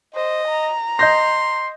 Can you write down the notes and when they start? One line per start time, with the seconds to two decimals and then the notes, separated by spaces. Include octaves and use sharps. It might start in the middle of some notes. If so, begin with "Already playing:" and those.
0.15 C5 D#5
0.48 A#5
0.99 D#5 C6 G6 A#6